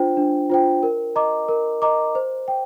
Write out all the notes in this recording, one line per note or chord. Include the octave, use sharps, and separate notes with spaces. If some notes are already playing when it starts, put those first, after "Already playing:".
Already playing: D4 F4 C5 G5
D4
F4 C5 G5
A#4
D#5 A#5 D6
A#4
D#5 A#5 D6
C5
G5